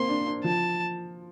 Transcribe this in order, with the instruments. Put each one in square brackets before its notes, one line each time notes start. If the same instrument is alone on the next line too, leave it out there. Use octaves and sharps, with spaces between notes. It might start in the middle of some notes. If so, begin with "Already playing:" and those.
Already playing: [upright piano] A#3 C4 [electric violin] C6
[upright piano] D4
D4
[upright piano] F3 [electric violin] A5